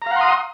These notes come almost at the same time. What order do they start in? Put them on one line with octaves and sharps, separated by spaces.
A#5 F5 F#5 C6 D#6